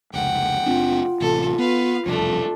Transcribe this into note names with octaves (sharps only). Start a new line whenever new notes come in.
F1 C#2 F#5 G5
F#1 C4 D4 F4
A1 C3 A4
B3 B4 F5
E1 C2 F2 A3 D4